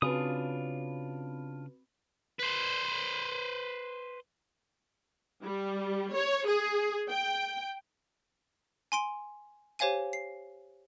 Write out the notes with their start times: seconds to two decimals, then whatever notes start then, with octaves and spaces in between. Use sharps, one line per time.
0.02 C#3 C4 D4 F4 F#4 B4 B5 D#6
2.39 B4 C5
5.42 G3
6.13 C#5
6.47 G#4
7.09 G5
8.92 G#5 C6 D7
9.79 G4 C5 C#5 F5 G#5 D#7
10.13 C7